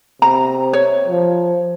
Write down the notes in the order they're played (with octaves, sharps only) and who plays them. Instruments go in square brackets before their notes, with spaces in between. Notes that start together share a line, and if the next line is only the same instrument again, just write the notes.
[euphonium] C3 [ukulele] A#5
[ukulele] C#5
[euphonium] F3